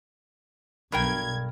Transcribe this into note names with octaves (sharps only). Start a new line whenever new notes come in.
B1 G2 A#4 G5 G#6